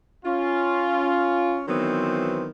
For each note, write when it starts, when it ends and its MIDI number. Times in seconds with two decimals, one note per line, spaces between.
0.25 1.61 61
0.25 1.61 65
1.68 2.47 51
1.68 2.47 52
1.68 2.47 54
1.68 2.47 59
1.68 2.47 60
1.68 2.47 72